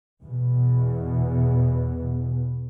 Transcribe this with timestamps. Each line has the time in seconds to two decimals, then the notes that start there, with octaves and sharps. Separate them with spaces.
0.22 E2 B2